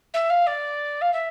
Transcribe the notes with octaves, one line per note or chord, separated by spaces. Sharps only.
E5
F5
D5
F5
E5